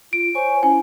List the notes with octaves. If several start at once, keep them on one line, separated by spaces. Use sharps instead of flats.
F4 D7
C5 C#5 G#5 C#6
C#4 E4 G#5